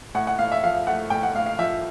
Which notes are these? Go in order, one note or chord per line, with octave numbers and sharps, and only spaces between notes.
A2 F#5
F#5
A2 F5
E5
F3 F5
A3 F#5
A2 G5
F#5
A2 F5
F5
F3 E5